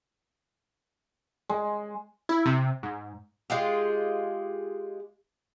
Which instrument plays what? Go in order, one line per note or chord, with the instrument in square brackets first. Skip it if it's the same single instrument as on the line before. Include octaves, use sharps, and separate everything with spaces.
[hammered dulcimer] G#3
[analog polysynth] E4
C3
G#2
[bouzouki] G#3 F4 G4